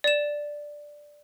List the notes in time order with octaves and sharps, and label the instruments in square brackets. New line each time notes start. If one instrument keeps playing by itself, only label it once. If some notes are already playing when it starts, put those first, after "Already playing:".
[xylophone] D5 E7